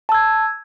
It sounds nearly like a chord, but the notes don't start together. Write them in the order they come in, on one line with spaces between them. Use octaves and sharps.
A5 E6 G#6